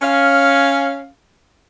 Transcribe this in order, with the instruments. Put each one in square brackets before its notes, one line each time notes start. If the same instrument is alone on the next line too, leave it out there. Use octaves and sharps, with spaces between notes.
[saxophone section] C#4 F5